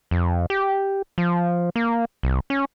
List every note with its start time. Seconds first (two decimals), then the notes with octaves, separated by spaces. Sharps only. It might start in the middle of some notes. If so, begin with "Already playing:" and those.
0.11 F2
0.50 G4
1.18 F3
1.76 A#3
2.23 C2
2.50 C#4